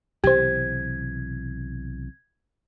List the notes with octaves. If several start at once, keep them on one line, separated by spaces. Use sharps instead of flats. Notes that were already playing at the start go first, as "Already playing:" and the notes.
B1 C3 E3 G4 C5 G#6